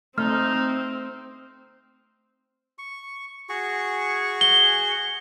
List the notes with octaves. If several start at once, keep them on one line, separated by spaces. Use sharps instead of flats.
A3 C4 D#4 F6
C#6
F#4 G#4 C#6
G7